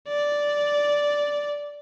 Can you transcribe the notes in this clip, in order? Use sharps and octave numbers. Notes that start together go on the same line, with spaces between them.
D5